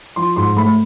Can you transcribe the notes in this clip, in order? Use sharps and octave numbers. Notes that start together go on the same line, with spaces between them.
F3 C6
G#2 C6
A3 B5